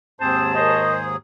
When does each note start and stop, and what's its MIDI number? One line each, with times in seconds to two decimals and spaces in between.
0.21 1.16 39
0.21 1.16 44
0.21 0.54 60
0.21 1.16 68
0.21 0.43 72
0.21 0.82 81
0.55 0.95 70
0.55 1.10 72
0.55 0.95 73
0.55 0.95 75